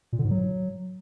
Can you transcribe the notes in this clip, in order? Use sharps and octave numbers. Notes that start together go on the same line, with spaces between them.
A#2
D3
G#2
F#3